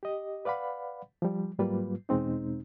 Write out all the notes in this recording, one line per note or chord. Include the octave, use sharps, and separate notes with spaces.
G4 D#5
B4 D5 F5 F#5 B5
F3 G3
G#2 F#3 G3 A#3 F4 B4
E2 B2 G#3 C4 D#4